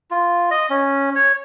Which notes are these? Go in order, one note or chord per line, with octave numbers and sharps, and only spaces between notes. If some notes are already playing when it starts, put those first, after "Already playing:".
F4
D#5
C#4
C#5